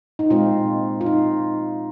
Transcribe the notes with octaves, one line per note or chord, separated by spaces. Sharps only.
D#4
A#2 G#3 C4 F4
F4
D#4